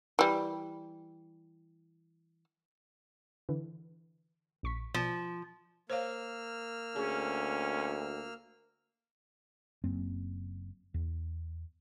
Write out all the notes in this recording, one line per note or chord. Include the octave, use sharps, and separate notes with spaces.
E3 G3
D3 E3
A#1 C#6 B6
B2 F3
A#3 C5 C#5 F5 E6 F6
D2 C#4 G#4
F#1 F#2 A#3 C4
E2